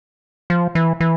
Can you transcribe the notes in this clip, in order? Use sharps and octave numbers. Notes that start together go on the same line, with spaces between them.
F3
E3
E3